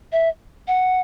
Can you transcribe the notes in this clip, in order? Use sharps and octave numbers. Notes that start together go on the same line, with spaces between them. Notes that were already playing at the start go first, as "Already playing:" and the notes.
E5
F#5